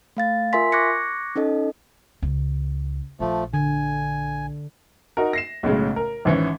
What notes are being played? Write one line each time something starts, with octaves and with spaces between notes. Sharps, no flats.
A3 F5 A6
F4 A#4 E5 G#5 C6 B6
C#6 D6 F#6 G#6 A#6 C#7
C#4 D#4 A4 D#5
C#2
A#1 F3 A3
D3 G#5
D#4 F#4 A#4
A#6 C7 E7
B1 A2 C#3 G#3
A#4
G#1 E3 C#4